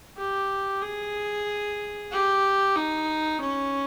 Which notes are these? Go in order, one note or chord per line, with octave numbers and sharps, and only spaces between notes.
G4
G#4
G4
D#4
C#4